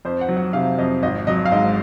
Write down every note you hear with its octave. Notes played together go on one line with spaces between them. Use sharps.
F2 C5
F#5
F#3
F#5
C3 F5
F2 D#5
G#1 D#5
F#3 D#5
F5
G#2 D#5